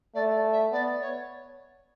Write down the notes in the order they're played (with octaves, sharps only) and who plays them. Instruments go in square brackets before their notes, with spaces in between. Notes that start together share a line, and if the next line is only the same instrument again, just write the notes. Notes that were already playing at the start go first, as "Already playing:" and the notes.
[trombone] A3 [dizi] D5
[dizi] D5
E5
[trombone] B3 [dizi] D5
[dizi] C#5